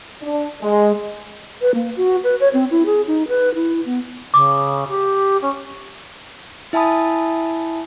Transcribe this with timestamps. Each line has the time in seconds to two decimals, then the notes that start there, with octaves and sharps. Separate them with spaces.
0.22 D4
0.62 G#3
1.61 B4
1.74 A#3
1.96 F#4
2.24 B4
2.40 C#5
2.53 C4
2.71 E4
2.86 G#4
3.07 D#4
3.28 B4
3.55 E4
3.86 B3
4.34 C#3 D6
4.88 G4
5.42 C#4
6.73 E4 E5 G#5 A5 B5 D#6